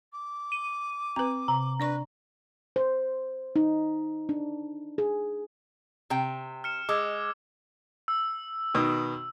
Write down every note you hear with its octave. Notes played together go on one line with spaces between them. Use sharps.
D6
D#7
C4 B4 A#5
C3 A#5
D4 B4 D5 C#6
C5
D#4
D4
G#4
C3 G5
F6 C#7 E7
G#3 D6 E6 G#6
E6
B2 D#3